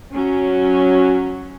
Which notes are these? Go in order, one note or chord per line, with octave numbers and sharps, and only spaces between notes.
F#3 C#4